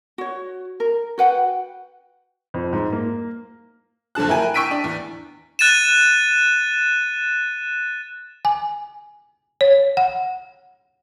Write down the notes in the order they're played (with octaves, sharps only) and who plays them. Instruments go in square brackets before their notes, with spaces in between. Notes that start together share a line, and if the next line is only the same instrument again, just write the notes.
[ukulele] F#4 C#5
A#4
F#4 B4 F#5 G5
[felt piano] F2
G#2
A#3
[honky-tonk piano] F#1 F2 D3 A5 F#6
E4 A#4 G5 G#5
G5 C#6 E6 B6 D7 D#7
D4
E2
[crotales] F#6 A6 D#7 E7
[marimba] G#5
C#5
F#5